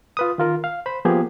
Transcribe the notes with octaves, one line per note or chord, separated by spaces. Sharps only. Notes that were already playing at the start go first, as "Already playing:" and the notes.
F4 B4 D#6
D#3 F4 A#4
F5
C5 B5
F3 A#3 B3 G4 G#4